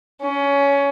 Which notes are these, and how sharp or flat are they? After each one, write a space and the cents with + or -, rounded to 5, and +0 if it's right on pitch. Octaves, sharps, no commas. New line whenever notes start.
C#4 +20